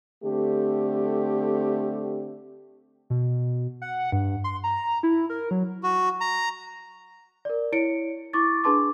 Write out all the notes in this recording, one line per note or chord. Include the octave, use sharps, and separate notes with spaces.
D3 A3 C4 G4
B2
F#5
G2
C6
A#5
E4
A#4
F#3
F#4
A#5
A#4 D5
E4 C#5 C#7 D7
E4 C#6 D6 A6
D4 G#4 B4 A5 C6 D6